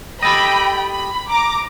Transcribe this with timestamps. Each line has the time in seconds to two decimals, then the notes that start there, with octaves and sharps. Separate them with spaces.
0.23 G4 A4 D#5 G5 B5
0.90 B5
1.29 A#5 D6